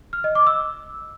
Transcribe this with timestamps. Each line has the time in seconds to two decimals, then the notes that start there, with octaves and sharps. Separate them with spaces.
0.13 F6
0.24 D#5
0.35 D6
0.47 E6